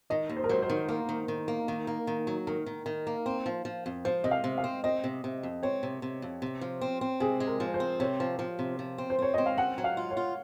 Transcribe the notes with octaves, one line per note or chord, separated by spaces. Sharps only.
D#3 D#5
D#2
C5
A#4
F#3 C5
C5
D#3
A#3 A#4
D#3
D#3
A#3
D#3
A#3
D#3
F#3
D#3 A#4
D#3
D#3
A#3
C4
F3
F3
F2
F3 C5
C3 D#5
F5
C3
F5
C4
C4 D#5
C3
C3
F2
C4 C#5
C3
C3
F2
C3
F3
C4
C4
C3 G#4
G#3
A#4
F3
C5
C4
C3 C#5
F3
F3
C3
F3
C4
C5
C4 C#5
C4 D#5
F5
C#4 F#5
F#3
F5
F4
C#5
F4